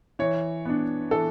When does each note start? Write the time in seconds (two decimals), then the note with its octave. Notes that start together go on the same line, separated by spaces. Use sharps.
0.19 E3 C#5
0.65 B3 D4
1.11 E3 A4